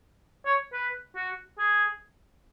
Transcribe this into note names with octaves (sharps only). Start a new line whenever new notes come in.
C#5
B4
F#4
G#4